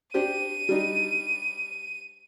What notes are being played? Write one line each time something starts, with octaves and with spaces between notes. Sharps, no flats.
D4 G4 C5 D#7
G3 D4 D#4